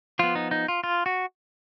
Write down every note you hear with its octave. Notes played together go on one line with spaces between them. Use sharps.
F3 B3 F4
D#4
D#4
F4
F4
F#4